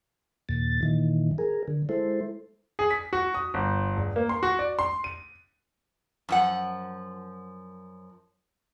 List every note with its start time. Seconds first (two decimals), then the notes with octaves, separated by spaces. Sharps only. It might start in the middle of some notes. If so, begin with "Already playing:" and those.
0.49 D#2 A#2 A6
0.83 A#2 D#3 E3
1.38 G#4 A#4
1.68 D3
1.89 G#3 E4 A4 C5
2.79 G#4
2.90 B6
3.13 F#4
3.34 D#6
3.54 G1
3.97 E1
4.16 A#3
4.29 C6
4.43 F#4
4.59 D5
4.79 C6
5.04 D#7
6.29 F#2 F3 F#5